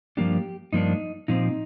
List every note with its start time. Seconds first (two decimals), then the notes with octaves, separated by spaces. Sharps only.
0.17 G2 F3 A#3 D4 G4
0.73 G2 F3 A#3 D4 D#4
1.28 A#2 F3 C4 D#4